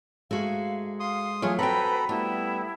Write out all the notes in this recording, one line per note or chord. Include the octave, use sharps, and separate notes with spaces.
G#2 G#3 A3 F#4 E5 F5
F5 C6 D#6
E3 F#3 A3 F4 G#4 C#5 F6
C4 F#4 A4 B4 F#5 G5 A#5 B5
G3 A3 B3 E4